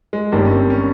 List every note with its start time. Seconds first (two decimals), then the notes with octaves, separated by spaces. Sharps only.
0.13 G#3
0.32 G1 G2 D#3 G3 A#3
0.45 C#4
0.52 C4
0.70 C#4